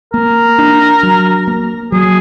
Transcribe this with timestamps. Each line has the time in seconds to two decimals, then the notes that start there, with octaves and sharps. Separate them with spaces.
0.13 A#3 A#4
0.58 D4
1.03 F#3
1.47 A#3
1.92 F#3 G#4